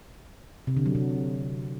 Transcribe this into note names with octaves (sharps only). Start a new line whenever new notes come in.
C3
D3
F#3
C3